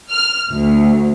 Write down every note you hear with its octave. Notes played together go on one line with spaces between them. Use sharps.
F6
D2